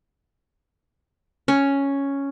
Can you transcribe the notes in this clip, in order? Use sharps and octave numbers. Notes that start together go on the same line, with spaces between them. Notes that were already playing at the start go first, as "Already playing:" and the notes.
C#4